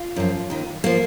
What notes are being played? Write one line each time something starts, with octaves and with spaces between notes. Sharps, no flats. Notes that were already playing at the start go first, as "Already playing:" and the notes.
Already playing: F4
F#2 F3
D#2 D#3
F3 A#3